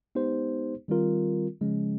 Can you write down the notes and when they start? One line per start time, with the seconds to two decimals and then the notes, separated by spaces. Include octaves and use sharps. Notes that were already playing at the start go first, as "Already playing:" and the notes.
0.15 G#3 B3 D#4 G4 C5
0.88 D#3 G3 C4 F4 A#4
1.61 C#3 F3 G#3 C#4